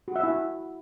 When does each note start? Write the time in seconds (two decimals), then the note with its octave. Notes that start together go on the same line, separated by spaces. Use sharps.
0.08 F#4
0.16 E5
0.23 E4